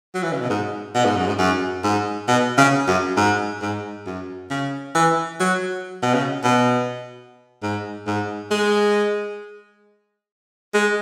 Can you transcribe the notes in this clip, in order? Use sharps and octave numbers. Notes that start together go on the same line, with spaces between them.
F#3
E3
C#3
B2
G#2
B2
G#2
F#2
G#2
F#2
G#2
B2
C#3
F#2
G#2
G#2
F#2
C#3
E3
F#3
B2
C#3
B2
G#2
G#2
G#3
G#3